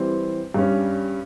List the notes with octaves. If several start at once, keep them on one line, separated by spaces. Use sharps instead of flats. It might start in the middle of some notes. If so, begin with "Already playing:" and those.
Already playing: E3 G3 C4
G2 G3 C#4